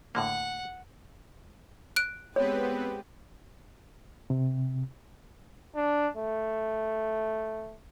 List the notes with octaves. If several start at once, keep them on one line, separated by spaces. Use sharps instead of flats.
A2 D3 A#3 F#5
F#6 D7
G#3 B3 C4 G4 B4 C#5
C3
D4
A3